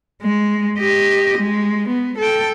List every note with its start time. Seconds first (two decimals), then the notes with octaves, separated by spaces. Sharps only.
0.22 G#3
0.78 G4 D#5
1.38 G#3
1.89 B3
2.18 A4 G5